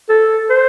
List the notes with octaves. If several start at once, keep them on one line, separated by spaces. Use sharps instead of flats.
A4
C5